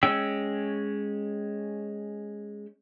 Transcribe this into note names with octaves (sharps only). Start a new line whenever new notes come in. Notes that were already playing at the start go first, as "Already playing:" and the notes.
G#3 C#4 G5 E6